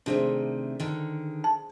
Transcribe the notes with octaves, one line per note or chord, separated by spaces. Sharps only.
C3 D#3 A3 D4 G#4 C5
D3 D#3
A5